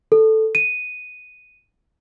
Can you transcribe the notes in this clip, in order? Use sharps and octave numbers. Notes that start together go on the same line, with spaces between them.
A4
D#7